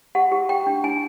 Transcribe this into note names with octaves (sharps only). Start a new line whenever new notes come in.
G4 F#5
G4
G4 G5
D4
D4 G#5